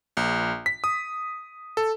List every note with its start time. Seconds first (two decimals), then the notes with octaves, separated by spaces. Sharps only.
0.17 A#1
0.66 B6
0.84 D#6
1.77 A4